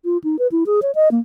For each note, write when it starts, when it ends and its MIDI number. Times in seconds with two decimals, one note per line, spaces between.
0.05 0.18 65
0.24 0.39 63
0.39 0.47 71
0.52 0.64 64
0.66 0.80 68
0.82 0.91 73
0.95 1.09 75
1.11 1.19 58